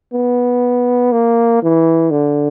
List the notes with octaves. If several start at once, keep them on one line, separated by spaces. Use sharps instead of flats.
B3
A#3
E3
D3